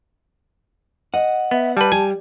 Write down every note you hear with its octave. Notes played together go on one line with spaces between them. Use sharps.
D#5 F#5
B3 E5
G3 B4 A5
G3 G#5